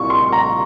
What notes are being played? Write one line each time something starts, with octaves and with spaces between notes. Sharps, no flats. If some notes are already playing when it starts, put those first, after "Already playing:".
Already playing: C2 A#2 C#6
C6
A#5